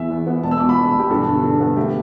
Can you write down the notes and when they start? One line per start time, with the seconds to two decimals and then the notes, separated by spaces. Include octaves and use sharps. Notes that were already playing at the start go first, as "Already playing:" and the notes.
Already playing: E2 E3 E5
0.10 E2
0.27 B3
0.43 E1 A5
0.51 E6
0.60 B2 D6
0.69 B5
0.77 E1 A5
0.94 E1
0.99 G4
1.10 G2 A4
1.27 D3
1.44 G2
1.60 B3
1.77 A3 G4